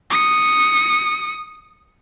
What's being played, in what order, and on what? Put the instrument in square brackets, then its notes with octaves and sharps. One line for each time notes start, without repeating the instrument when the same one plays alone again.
[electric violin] D#6 C#7